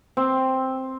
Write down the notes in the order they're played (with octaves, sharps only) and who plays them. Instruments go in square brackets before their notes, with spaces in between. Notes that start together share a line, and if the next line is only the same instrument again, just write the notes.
[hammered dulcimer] C4